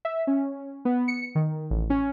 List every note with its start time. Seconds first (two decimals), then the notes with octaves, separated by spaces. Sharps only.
0.05 E5
0.27 C#4
0.85 B3
1.08 C#7
1.35 D#3
1.70 A1
1.90 C#4